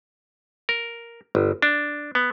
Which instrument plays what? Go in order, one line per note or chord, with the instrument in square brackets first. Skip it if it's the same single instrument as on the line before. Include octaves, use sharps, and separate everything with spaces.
[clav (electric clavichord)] A#4
G1
D4
B3